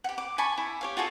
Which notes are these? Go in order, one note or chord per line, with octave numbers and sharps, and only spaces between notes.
G4 F#5
D6
G#5 A5 B5 C#6
E4
G4 C#5 F5
F4 F#4 G#4 A4